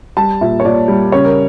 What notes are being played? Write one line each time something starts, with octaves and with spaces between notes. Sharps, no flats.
G3 A5
A#2 E5
C#5
A#2 D5
G3
C#3 C#5
A#4